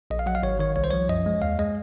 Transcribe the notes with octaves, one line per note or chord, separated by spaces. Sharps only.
A#1 D#5
F5
F#3 F#5
F5
G#1 C#5
D#3 C#5
C2 C#5
C5
F3 C#5
F#2 D#5
G#3
D#2 F5
G#3 D#5